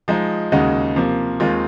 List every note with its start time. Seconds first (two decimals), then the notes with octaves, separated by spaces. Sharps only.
0.08 F3 G#3 D#4
0.52 D#2 C#3 G#3 D#4 F#4
0.96 C3 F3 A#3
1.40 D#2 D#3 G#3 C4 F4